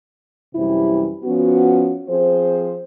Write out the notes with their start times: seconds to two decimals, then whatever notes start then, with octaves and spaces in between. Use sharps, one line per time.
0.56 F#2 C3 E3 G3 E4
1.25 F3 B3 C#4 F#4
2.08 F3 C4 G#4 C5